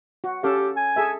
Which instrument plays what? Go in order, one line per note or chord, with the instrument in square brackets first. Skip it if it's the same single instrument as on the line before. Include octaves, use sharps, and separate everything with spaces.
[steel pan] F#4
[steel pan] C#4 A4 F5 [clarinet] G4
[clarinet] G#5
[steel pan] G#4 A4 E5